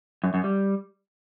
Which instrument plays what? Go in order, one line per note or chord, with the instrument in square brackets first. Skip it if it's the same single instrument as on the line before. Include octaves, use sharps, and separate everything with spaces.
[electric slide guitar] F#2
F#2
G3